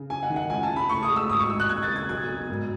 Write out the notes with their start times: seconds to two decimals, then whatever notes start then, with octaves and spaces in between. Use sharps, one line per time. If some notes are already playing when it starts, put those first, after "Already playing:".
Already playing: C#3
0.10 F#2 G#5
0.23 F#5
0.30 D#3
0.36 F#5
0.50 C#2 G#5
0.63 A5
0.70 C#3
0.76 B5
0.89 A2 C#6
1.03 D#6
1.10 G#3
1.16 E6
1.29 G#1 D#6
1.39 C#6
1.50 G#2 E6
1.60 F#6
1.69 D#2 G#6
1.83 A6
1.89 C#3
1.96 G#6
2.09 B1 G#6
2.29 B2
2.49 G#1